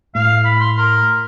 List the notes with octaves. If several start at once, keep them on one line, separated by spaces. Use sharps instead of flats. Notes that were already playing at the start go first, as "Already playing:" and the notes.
A2 F5
B5
C6
A#4